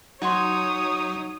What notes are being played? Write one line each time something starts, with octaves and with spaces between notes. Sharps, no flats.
F#3 D#4 F#4 C#5 G#5 C6 D#6